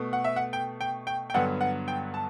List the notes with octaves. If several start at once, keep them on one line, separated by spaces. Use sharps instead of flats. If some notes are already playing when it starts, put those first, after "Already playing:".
Already playing: B2 A3
F#5
E5
F#5
G5
G5
G5
G5
G2 D3 F#3 B3 F#5
F#5
G5
A5